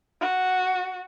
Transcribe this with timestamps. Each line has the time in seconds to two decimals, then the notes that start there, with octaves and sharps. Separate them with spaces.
0.21 F#4